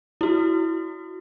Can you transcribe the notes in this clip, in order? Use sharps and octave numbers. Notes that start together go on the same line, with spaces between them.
E4 F#4